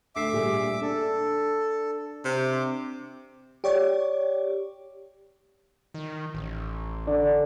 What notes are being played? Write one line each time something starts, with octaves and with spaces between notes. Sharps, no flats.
D2 A3 E5 D6 C7
A#2 G3 G#4
D4 A4
C3 D6
G4 C#5 D5
D#3
A1
D3 D4